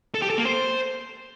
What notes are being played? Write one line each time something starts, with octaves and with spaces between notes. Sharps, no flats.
A4
G4
A4
A#3
C5